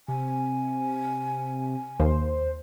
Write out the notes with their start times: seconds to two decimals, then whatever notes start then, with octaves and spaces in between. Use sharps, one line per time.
0.08 C3 G#5
2.00 D#2 C5